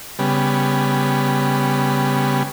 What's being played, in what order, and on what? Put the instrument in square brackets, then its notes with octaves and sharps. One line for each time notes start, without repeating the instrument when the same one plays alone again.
[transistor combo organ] C#3 G3 B3